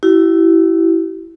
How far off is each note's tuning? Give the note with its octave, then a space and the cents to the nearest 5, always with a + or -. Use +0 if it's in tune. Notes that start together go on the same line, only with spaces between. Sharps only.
E4 +0 G4 -45